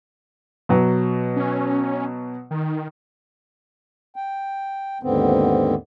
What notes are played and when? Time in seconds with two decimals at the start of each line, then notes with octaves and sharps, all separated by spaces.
0.69 B2 F#3
1.36 C#4
2.51 D#3
4.16 G5
5.03 D#2 G#2 D3 B3 C4